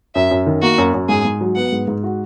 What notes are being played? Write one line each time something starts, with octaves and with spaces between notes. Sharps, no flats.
F#2 E5
F#2
D#3
A#3 F#4
F#2
F#2
G#2 G#4
G#2
F#3
B3 F#5
G#2
G#2
F#4